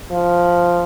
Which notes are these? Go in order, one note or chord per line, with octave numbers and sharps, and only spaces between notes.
F3